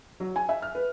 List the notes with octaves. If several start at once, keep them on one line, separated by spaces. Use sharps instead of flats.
F#3
G#5
E5
F6
B4